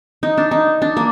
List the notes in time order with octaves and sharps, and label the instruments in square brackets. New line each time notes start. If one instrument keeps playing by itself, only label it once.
[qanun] D#4
D4
D#4
D4
A#3